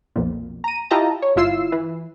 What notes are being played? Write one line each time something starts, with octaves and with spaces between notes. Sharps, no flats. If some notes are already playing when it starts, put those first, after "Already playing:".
B1 F2 A#2
A#5 D#7
E4 F4 G4 D#5 A5 A#5
C#5
G1 G2 E4 F4 E6 C7
E3